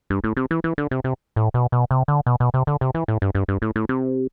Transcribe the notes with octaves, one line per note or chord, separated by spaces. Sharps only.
G2
A2
C3
E3
E3
D3
C3
C3
A2
B2
B2
C3
D3
B2
B2
C3
D3
C3
E3
A2
G2
G2
G2
A2
A2
C3